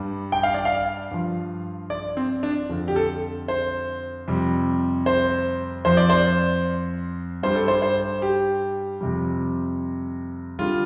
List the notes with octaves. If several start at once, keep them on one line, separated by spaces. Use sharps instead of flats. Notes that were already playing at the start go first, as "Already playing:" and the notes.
Already playing: G2 G3
G5
F5
D5
F5
G2 F3
D5
C4
D4
F2 D3 F3
G4
A4
C5
F2 C3 G3
C5
F2 F3 C5
D5
C5
G2 G3 C5
A4
C5
C5
G4
F2 C3 G3
D3 G3 F4